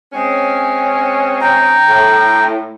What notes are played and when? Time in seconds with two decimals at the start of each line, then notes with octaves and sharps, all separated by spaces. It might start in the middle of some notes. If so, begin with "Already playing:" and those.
0.13 G#3 C4 C#4
1.41 G5 A#5
1.88 A2